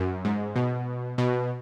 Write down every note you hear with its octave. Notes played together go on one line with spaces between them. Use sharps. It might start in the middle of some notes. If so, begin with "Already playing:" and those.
Already playing: F#2
G#2
B2
B2